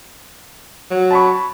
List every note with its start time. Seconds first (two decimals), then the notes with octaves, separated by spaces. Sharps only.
0.91 F#3
1.11 A5 B5 C#6